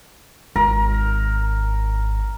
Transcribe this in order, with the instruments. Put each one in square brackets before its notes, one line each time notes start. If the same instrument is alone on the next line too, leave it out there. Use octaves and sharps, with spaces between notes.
[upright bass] G#1 [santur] A#4